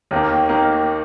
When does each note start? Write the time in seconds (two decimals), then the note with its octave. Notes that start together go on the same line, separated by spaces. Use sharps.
0.11 D#2 D#3 A#3
0.49 D#3 A#3